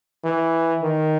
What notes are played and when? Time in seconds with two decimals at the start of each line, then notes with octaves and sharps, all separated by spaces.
0.24 E3
0.83 D#3